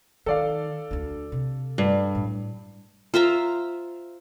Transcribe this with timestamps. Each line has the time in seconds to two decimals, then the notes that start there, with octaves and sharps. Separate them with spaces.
0.26 D#3 A4 D5 F5
0.91 D2 D4
1.32 C3
1.78 G2
2.15 A2
3.14 F4 C5 E5 A#5